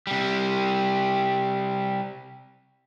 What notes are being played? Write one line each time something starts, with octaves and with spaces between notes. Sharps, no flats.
C3 G3